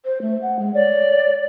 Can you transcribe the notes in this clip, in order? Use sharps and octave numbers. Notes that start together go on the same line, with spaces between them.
C5
A3
F#5
G#3
C#5 D5